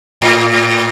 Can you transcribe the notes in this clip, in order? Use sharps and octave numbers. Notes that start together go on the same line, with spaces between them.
A2